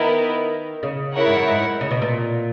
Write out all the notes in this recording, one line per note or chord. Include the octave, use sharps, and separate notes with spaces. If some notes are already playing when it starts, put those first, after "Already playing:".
Already playing: D#3 B3 E4 A#4
C#3
E4 A#4 C#5 F#5
G#2
F#2
G#2
C#3
B2
A#2